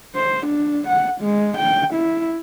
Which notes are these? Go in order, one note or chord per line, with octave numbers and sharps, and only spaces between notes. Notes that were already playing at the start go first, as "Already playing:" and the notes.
C5
D4
F#5
G#3
G5
E4